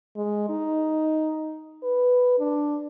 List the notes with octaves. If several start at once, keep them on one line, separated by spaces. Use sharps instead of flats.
G#3
D#4
B4
D4